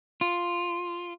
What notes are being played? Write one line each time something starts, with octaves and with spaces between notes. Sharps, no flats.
F4